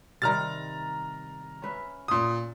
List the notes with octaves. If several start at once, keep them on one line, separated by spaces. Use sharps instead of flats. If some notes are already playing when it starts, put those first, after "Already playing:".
C3 D#3 G3 A#5 F6 A6
C#4 B4 E5
A#2 D#6